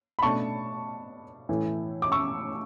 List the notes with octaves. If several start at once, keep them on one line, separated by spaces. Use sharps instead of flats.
B5
B2 A3 D4 A5 C#6
A2 E3 A3 E4
D6
C#6 E6